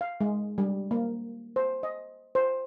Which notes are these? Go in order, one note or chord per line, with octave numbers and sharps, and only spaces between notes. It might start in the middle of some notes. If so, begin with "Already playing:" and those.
F5
G#3
G3
A#3
C5
D#5
C5